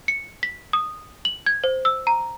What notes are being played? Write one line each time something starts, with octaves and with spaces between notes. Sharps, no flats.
C#7
B6
D#6
F#7
G#6
C5
E6
A#5